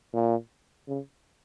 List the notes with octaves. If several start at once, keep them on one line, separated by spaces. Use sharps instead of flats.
A#2
C#3